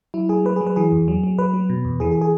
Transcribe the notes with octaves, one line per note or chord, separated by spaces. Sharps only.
F#3 E4
F#3 G#4
F#3 B4
G#4
F#3
B4
E3 G#4
E2
F#3
F#3
F#3 B4
F#3
B2
E2
E3 G#4
G#4
G#4